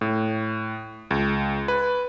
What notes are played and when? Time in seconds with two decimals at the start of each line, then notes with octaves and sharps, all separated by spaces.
0.01 A2
1.11 C#2
1.68 B4